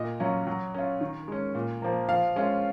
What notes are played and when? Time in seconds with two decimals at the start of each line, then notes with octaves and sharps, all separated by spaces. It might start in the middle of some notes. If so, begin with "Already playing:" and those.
Already playing: A#2 D#5
0.20 F#3 C#4 F4
0.47 F#3
0.74 C#4 F4
1.01 D#3
1.28 G#3 C#4
1.54 A#2
1.82 F3 A#3
2.09 F3 F5
2.36 G#3 C#4 F4